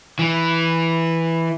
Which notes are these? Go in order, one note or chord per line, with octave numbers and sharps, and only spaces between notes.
E3